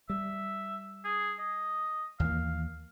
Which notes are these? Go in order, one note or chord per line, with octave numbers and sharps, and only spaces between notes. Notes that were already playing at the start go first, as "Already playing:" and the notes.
G3 E5
G#4
D#5
D#2 E3 A#3 F5